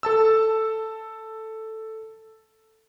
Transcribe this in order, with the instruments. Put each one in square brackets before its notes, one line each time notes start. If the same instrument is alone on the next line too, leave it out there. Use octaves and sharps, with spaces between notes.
[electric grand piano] A4 A5 E6